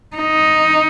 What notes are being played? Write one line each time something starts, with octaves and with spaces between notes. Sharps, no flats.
D#4